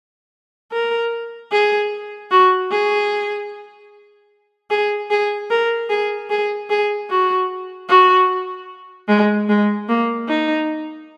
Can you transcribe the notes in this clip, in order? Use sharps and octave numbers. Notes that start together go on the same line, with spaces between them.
A#4
G#4
F#4
G#4
G#4
G#4
A#4
G#4
G#4
G#4
F#4
F#4
G#3
G#3
A#3
D#4